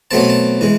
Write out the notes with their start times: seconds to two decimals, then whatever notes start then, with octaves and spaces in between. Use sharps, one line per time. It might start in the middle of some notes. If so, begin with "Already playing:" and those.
0.11 B2 F#3 A3 C4 A5
0.20 G#5
0.30 A5
0.61 E3 G#3